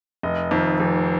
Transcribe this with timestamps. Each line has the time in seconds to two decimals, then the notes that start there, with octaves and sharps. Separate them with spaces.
0.23 F1 D#5
0.51 F2 D#3
0.80 F1